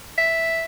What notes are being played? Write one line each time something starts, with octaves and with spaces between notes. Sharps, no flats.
E5